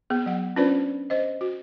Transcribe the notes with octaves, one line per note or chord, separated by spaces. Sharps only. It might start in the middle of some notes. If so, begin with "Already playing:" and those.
B3 G#4
F#3 F#5
C#4 D4 F4 B4 C5 D5
C5 D#5
F#4